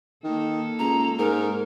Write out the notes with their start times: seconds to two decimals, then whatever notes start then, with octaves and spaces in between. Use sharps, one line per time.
0.24 D#3 A#3 A4
0.79 C#2 A#5
1.19 G#2 A#4